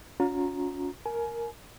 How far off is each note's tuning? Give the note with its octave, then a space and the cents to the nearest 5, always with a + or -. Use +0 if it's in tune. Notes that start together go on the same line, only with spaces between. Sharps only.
C#4 +30 F4 +45 A#5 +0
A#4 +0 G#5 +30